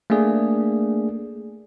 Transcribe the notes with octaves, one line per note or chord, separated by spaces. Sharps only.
A3 A#3 D4 G#4 D5